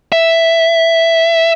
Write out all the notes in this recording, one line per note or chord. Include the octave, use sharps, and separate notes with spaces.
E5